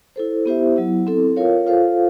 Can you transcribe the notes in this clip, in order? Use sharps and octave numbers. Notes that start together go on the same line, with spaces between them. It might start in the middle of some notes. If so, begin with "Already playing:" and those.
E4 A4 C5
B3 E4 G4 C5 E5
F#3 B3 E4
C4 E4 A4
F4 A#4 C#5 F5
F4 A4 C5 F5